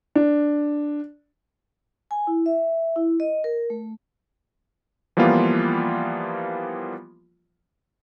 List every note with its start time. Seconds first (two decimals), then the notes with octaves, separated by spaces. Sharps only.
0.15 D4
2.11 G#5
2.27 E4
2.46 E5
2.96 E4
3.20 D#5
3.44 A#4
3.70 A3
5.17 E3 F3 G3 A#3 B3 F4